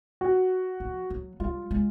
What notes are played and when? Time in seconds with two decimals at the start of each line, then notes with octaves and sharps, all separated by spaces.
0.21 F#4
0.80 F3
1.10 F#3
1.40 G3 F4
1.71 G#3